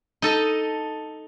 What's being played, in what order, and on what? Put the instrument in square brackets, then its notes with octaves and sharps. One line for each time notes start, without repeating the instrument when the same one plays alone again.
[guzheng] D#4 A4 D#5